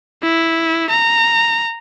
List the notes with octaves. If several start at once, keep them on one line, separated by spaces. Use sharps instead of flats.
E4
A#5